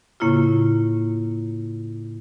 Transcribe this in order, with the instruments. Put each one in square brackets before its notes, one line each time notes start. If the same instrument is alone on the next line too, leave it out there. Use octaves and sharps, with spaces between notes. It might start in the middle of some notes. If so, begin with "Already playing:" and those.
[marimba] A2 C#3 A#3 E4 F4